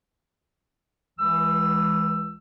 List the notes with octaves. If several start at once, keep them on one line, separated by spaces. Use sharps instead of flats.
C#2 E3 E6